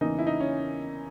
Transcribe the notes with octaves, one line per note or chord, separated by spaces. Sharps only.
E2 C#3 E3 A#3 D#4
E4
D#4
C#4